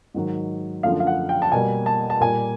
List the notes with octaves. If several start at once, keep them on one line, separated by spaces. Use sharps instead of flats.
G#2 D#3 F#3
F#2 D3 F3 A3 F5
F5
F#5
G5
A5
B2 G3 A#3 G#5
A5
A5
A#2 G3 A#3 G#5